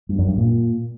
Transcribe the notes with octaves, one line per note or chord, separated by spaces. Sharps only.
G2
F#2
G2
A#2